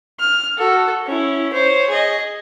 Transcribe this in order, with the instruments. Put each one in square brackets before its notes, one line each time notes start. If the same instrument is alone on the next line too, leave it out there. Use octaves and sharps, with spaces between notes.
[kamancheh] F6
F#4 A4
C#4 E4
C5 C#5
G#4 D#5